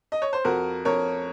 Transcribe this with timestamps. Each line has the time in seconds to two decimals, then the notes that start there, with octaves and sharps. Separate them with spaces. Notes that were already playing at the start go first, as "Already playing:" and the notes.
0.12 D#5
0.22 C#5
0.33 C5
0.45 F2 F#4 A#4
0.85 F2 A#4 C#5